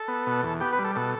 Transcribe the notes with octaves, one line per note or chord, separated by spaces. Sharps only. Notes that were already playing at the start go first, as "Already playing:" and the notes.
Already playing: A4
B3
B2
E2
B3 G4
B4
G3
A4
B2 A4